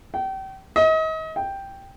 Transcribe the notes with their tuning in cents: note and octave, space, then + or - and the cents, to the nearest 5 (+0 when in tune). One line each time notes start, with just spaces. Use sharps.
G5 -35
D#5 +35
G5 +0